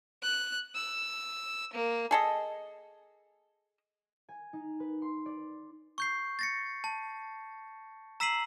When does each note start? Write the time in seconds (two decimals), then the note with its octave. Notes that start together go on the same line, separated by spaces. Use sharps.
0.23 F#6
0.75 E6
1.73 A#3
2.11 G#4 A4 D#5
4.29 G#5
4.53 D#4
4.80 B4
5.02 C6
5.26 D5
5.98 C#6 G6 C7
6.39 A6 A#6 C#7
6.84 A5
8.20 A#5 E6 B6 C7 D#7 F#7